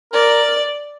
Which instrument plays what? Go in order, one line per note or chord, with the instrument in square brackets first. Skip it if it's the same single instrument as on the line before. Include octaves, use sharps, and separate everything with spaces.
[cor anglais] A#4 [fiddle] D5